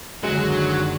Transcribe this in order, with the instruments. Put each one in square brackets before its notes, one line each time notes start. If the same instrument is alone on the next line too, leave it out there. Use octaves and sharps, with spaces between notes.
[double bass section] F#1 D3 D#3 [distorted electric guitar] F#3 [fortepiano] G#3